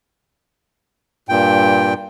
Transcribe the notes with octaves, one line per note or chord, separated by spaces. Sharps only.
G2 A#2 G5